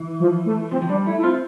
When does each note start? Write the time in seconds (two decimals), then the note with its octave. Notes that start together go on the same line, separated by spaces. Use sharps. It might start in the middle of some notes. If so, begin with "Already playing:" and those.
Already playing: E3
0.20 F3
0.46 A3
0.71 F3 C4
0.82 F3
0.89 G3 D4
1.06 A3 E4
1.18 E4
1.23 C4 F4